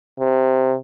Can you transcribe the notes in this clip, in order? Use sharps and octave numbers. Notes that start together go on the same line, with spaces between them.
C3